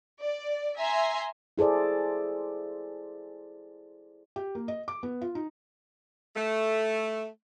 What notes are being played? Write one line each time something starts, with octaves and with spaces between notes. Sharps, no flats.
D5
E5 G#5 A#5 C6
E4 G#4 A4 C5 D5
G4
A#3
D#5
D6
B3
F4
D#4
A3